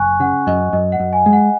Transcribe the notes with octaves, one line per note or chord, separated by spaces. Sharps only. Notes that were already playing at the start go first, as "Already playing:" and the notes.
Already playing: F#1 G#5 C#6 F#6
C#3 F#5
F#2 D#5
F#2 D#5
F#5
F#2
G#5
G#3
F#5